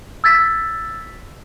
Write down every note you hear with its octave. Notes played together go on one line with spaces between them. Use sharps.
E6 G#6 A6 B6